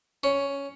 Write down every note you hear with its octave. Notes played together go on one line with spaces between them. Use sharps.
C#4